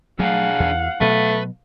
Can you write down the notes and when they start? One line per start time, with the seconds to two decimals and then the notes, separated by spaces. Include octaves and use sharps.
0.20 F#3 A3 D4 G#4 F5 F#5
0.60 E2
1.01 B2 F#3 A3 B4